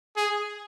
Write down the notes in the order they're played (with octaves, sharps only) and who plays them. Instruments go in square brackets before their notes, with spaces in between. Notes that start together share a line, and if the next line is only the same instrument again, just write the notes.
[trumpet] G#4